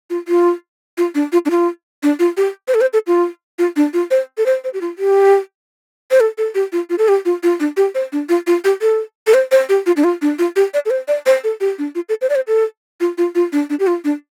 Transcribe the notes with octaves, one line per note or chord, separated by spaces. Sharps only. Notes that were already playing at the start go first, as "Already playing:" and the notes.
F4
F4
F4
D4
F4
D4
F4
D4
F4
G4
C5
A4
C5
A4
F4
F4
D4
F4
C5
A4
C5
C5
G4
F4
G4
C5
A4
A4
G4
F4
F4
A4
G4
F4
F4
D4
G4
C5
D4
F4
F4
G4
A4
A4
C5
C5
G4
F4
D4
F4
D4
F4
G4
D5
A4
C5
D5
C5
A4
G4
D4
F4
A4
C5
D5
C5
A4
F4
F4
F4
D4
D4
G4
F4
D4